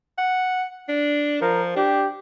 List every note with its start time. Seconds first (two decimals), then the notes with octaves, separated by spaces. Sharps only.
0.18 F#5
0.89 D4
1.41 F3 A#4
1.76 D4 G4